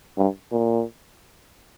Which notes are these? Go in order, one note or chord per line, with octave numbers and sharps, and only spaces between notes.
G2
A#2